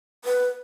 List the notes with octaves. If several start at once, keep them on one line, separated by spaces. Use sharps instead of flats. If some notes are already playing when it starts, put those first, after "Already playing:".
B4